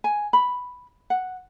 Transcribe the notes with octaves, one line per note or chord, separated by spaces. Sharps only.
G#5
B5
F#5